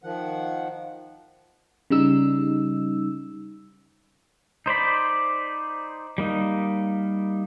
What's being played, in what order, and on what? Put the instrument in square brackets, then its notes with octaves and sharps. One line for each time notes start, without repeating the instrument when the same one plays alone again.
[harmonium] D#3 F3 F#5
[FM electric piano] C#3 G3 D#4 E6
[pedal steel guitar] D#4 C5 D5 B5
G3 A#3 D#4